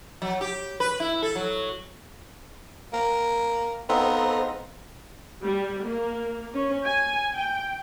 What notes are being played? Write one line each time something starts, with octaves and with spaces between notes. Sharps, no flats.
F#3
G4
B4
E4
A4
F#3
A#3 G5
B3 C4 D#4 A4 C5 F5 A#5
G3
A#3
C#4
G#5
G5